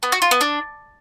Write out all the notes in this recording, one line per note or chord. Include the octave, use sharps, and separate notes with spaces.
B3
F#4
F4
B3
D4